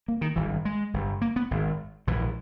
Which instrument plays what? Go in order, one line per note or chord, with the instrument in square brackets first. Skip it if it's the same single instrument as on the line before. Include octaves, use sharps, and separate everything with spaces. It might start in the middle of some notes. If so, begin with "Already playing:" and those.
[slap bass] A#3
D#3
G#1 G2 E3
G#3
G1 G2
A#3
B3
G#1 G#2
A#1 G#2 E3